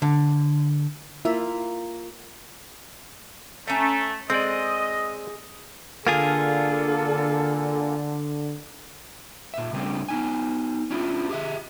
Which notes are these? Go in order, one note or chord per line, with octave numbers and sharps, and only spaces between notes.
D3
A#3 E4 F4 E5
A3 C#4 A#5
G#3 C4 D5 D#5
D3 A#3 D4 F4 G#4 A4
A#2 E5
C#3 G3 A3 B3 C4 D4
B3 D#4 G#5
C#4 D4 E4 F4
G4 G#4 E5